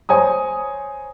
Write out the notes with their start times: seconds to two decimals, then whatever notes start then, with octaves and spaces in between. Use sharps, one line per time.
0.09 C5 C#5 G#5 A#5 D#6